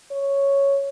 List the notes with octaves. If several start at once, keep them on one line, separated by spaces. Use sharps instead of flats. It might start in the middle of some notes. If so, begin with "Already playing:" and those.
C#5